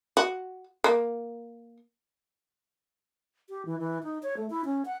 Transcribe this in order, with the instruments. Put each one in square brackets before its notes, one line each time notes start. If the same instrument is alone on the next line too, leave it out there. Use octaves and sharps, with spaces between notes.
[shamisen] F#4
A#3
[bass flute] G4
E3
E3
D#4
C#5
A3
E4
C#4
F#5